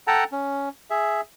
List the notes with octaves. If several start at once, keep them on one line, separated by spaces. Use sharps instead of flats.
A4 F#5 G5 A5 A#5
C#4
G#4 E5